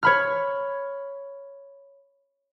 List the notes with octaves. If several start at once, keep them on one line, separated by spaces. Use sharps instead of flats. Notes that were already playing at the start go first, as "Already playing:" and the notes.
C#5 B5 F6